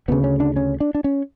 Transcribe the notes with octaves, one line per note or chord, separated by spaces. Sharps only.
D2 C#3 B3
C#4
D4
C#4
D4
D4
C#4